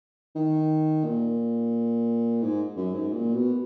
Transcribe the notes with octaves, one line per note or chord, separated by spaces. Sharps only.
D#3
A#2
G#2
F#2
G#2
A#2
B2